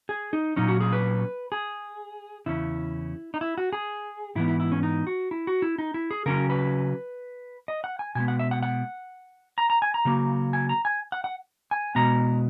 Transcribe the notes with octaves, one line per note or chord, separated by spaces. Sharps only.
G#4
D#4
A#2 F#3 C#4 D#4
F#4
G#4
B4
G#4
E2 C#3 C#4 E4
D#4
E4
F#4
G#4
G#2 E3 B3 E4
E4
E4
C#4
D#4
F#4
E4
F#4
E4
D#4
E4
G#4
C#3 F#3 C#4 A#4
B4
D#5
F#5
G#5
B2 G#3 B3 G#5
F#5
E5
F#5
F#5
A#5
A#5
G#5
A#5
C#3 F#3 A#3
G#5
A#5
G#5
F#5
F#5
G#5
B2 G#3 B3 A#5